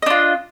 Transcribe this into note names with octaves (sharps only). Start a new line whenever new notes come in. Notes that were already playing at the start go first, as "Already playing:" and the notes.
D4 F4 D#5